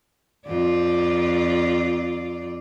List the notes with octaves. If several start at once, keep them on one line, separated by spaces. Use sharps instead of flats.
F2 F4 D5